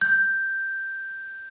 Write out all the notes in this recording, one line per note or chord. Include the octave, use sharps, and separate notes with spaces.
G6